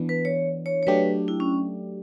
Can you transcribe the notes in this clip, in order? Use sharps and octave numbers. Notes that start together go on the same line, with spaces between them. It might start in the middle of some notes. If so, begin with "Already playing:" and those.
Already playing: E3 B3 D4
B4
C#5
C#5
C#5
F#3 A3 D4 G4 B4
E4
C#4